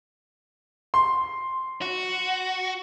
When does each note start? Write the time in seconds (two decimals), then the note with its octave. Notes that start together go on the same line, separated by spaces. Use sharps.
0.94 C6
1.82 F#4